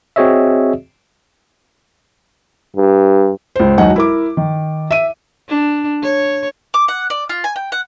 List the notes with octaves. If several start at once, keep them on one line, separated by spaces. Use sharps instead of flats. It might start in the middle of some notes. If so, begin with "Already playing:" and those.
C4 F#4 G#4 C#5 D#5 E5
G2
C#2 C5
E1 B1 D#4 F#4 F#5 G#5
E4 A#4 D6
D#3
E5 D#7
D4
C#5
D6
F#5
D5
F4
G#5
G5
F#5